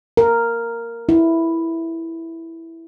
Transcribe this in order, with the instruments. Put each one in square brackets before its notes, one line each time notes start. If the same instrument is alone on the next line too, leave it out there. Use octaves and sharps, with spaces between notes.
[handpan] A#4
E4